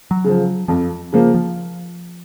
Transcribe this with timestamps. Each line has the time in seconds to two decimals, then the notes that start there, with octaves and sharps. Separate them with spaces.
0.11 F#3
0.24 C#3 F3
0.68 F2 F3
1.13 C#3 F3 A#3
1.34 F3